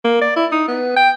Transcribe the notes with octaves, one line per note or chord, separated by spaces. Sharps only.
A#3
D5
E4
D#4
B3
G5